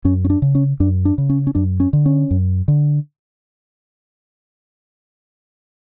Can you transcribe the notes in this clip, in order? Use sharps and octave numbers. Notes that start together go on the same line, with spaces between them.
F#2 C#4
C#4
D4
C#3
C#4
F#2 D4
D4
C#3
C#4
C#4
F#2 D4
C#4
D3
C#4
F#2
D3